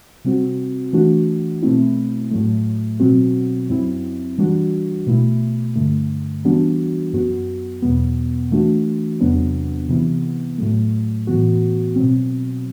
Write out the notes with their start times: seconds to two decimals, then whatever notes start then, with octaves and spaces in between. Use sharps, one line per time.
0.25 C3 G3 C4 F#4
0.93 E3 A3 D4 F#4
1.62 B2 A3 C4 E4
2.31 A2 F#3 A3
3.00 B2 F#3 C4 F#4
3.69 F#2 F#3 C4 E4
4.38 E3 G3 D4 F#4
5.07 B2 A3 E4
5.76 G2 D3 A3
6.45 E3 G3 B3 D4 F#4
7.13 F#2 F#3 B3 F#4
7.82 E2 B2 F#3 B3
8.51 E3 A3 D4 F#4
9.20 E2 C3 F#3 B3 D4
9.89 C3 E3 B3 E4
10.58 A2 F#3 A3
11.27 A2 E3 B3 F#4
11.96 B2 F#3 C4